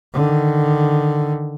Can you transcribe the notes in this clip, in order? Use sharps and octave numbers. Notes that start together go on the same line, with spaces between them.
D3 D#3